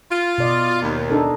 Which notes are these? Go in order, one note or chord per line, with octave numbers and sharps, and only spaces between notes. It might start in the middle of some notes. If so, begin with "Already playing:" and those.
F4
B2 D5 D#5
D#2
D4 D#4 A4